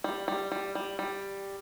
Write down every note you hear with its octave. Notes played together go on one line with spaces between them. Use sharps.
G3
G3
G3
G3
G3